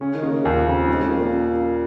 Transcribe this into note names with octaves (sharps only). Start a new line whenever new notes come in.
C#3 C#4
D#3
A#3
C#3
D#2 A#2
F2 C#3
G#2 C#4
F2
A#3
A#2
C#4
A#3